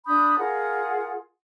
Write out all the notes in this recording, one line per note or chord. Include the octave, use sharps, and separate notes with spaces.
D4 B5 D#6 G6
F4 G#4 A#4 F#5